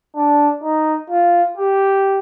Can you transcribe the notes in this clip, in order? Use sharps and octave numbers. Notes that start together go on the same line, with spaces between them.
D4
D#4
F4
G4